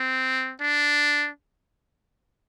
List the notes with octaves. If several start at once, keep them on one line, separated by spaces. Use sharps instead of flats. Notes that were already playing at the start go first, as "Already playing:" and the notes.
Already playing: C4
D4